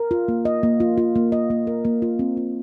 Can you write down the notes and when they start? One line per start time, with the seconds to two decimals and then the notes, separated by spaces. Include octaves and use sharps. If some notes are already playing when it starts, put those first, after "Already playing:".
Already playing: A#4
0.11 F4
0.28 A#3
0.45 D#5
0.63 A#3
0.80 F4
0.98 F4
1.16 A#3
1.32 D#5
1.50 A#3
1.67 A#4
1.85 A#3
2.02 F4
2.19 C4
2.37 F4